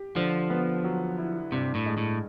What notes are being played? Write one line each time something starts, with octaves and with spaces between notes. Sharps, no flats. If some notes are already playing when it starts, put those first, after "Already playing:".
Already playing: G4
D3 F3
B3
F#3
E4
G2 C3
A2
G#3
A2